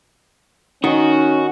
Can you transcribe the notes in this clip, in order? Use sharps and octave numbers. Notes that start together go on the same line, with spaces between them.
D#3 C#4 D#4 F#4 D#5